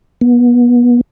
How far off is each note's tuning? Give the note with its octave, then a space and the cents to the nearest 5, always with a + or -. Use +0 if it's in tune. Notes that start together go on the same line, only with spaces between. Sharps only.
B3 -30